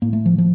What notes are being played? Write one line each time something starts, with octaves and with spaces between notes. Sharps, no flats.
A2 A#3
A3
F3
F3